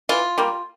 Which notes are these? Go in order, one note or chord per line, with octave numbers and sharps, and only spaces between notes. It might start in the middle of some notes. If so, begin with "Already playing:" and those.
E3 F4
G3 A#3